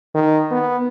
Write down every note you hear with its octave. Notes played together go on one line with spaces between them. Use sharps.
D#3
B3